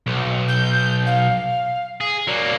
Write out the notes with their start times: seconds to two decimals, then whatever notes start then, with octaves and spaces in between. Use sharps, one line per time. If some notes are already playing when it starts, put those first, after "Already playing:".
0.06 B1
0.48 G6
1.06 F5
2.01 G#4
2.27 F#3 A#3 D5